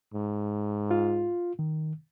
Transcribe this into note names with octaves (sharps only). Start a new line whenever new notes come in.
G#2
F4
D#3